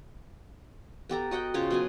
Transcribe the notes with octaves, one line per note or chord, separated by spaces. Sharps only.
B3 G4 A4 A#5
F#4 D#5 F#5 G5
C#3 F4 C5 C#5
B2 F#3 G#5